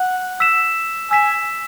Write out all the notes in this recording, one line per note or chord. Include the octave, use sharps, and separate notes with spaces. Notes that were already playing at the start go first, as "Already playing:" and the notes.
Already playing: F#5
E6 B6 E7
G#5 E6 B6 E7